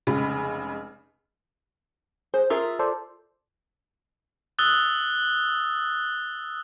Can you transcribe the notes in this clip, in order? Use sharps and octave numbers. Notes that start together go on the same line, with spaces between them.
F1 C#3 G#3 B5
G#4 C5
F4 G#4 A#4 E5
A4 C5 D5
D#6 E6 F#6 A6 G7